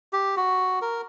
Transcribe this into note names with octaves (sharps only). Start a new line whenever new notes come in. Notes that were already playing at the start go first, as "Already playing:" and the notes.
G4
F#4
A#4